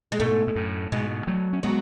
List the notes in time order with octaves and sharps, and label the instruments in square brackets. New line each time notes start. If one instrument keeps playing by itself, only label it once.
[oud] G#3
[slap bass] G#2 B2 [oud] A3
[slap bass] G#2
F#2 A2
[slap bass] G#2 B2 [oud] G#3
[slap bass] F#3 A3
C#4
[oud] F#3 [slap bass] G#3 B3